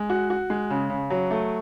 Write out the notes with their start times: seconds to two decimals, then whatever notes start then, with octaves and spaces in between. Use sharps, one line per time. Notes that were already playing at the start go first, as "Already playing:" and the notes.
Already playing: G#3
0.10 F#4
0.30 F#4
0.50 G#3
0.70 C#3
0.90 C#3
1.10 F#3
1.31 A3